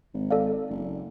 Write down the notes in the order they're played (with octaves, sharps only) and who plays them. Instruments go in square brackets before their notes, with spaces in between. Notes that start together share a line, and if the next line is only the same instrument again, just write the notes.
[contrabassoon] G#1
[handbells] A4 D5 F5
[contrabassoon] F#1